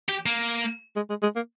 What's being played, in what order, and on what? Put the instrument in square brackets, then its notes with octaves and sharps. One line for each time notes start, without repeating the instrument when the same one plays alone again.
[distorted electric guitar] G4
A#3
[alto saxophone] G#3
G#3
G#3
A#3